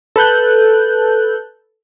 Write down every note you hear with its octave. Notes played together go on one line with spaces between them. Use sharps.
A4 B4 F#6 G6